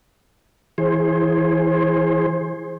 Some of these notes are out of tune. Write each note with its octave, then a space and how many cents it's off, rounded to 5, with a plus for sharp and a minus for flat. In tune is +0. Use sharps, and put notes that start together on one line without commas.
E3 +0 G#4 +0 C5 +25